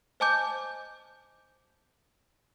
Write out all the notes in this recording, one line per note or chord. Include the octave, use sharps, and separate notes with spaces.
C5 D#5 G#5 A5 D6 G6